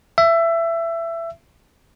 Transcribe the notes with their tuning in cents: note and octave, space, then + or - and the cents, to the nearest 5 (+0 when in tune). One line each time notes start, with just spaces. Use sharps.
E5 +20